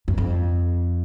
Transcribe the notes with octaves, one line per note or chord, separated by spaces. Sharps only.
F#2
F2